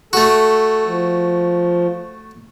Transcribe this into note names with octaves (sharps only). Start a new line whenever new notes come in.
A3 F#4 A4
F3